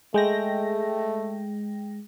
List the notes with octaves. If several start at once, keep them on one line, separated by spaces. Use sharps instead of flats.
G#3 A3 G5 A#6